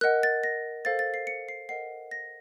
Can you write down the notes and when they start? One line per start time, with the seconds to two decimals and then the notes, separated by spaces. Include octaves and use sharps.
0.01 A#4 D#5 F#5 F#6
0.23 A6
0.44 A#6
0.85 A4 C5 F5 A6
0.99 A6
1.14 C7
1.27 C#7
1.49 C7
1.69 A#4 D#5 F#5 C7
2.11 A#6